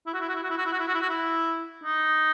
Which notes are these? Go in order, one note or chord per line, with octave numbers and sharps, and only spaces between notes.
E4
F#4
E4
F#4
E4
F#4
E4
F#4
E4
F#4
E4
F#4
E4
F#4
E4
D#4